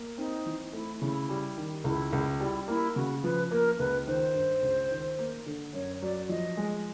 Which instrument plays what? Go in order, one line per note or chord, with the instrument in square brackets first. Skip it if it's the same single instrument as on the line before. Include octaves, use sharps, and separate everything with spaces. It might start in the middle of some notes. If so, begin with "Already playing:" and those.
Already playing: [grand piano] A#3
[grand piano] C4 [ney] D#4
[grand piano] E3
[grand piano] A3 [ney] E4
[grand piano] C#3 [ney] E4
[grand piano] G3
D#3
[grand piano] C#2 [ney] E4
[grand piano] C#2
[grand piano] G3 [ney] E4
[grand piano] A#3 [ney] E4
[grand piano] C#3 [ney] F#4
[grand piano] F3 [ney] B4
[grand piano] A#3 [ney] A#4
[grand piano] C#2 [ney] B4
[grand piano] D#3 [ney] C5
[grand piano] G2
C#2
D#3
A#3
D3
[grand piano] F#2 [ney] C#5
[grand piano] F#3 [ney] D5
[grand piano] F3 [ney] D#5
[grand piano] G#3